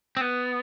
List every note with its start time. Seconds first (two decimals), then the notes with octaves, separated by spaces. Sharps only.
0.17 C4
0.21 B3